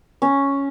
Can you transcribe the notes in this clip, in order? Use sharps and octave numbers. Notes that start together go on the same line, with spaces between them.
C#4